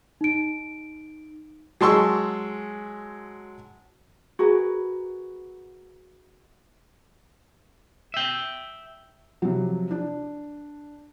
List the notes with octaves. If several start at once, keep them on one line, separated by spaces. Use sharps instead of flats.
D#4 D7
F#3 G#3 A5 C6 C#6 E6
F#4 G#4 A#4 B4
E5 G5
C3 F3 F#3
D4